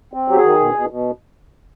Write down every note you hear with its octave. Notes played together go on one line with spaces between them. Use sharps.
C4
F#3 G4
G#4
D#3
B2
B2
B2